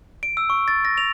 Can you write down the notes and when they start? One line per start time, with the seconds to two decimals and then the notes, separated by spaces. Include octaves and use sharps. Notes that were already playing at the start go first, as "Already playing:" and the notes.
0.23 D7
0.37 E6
0.50 C#6
0.68 A6
0.85 A#6
0.98 F7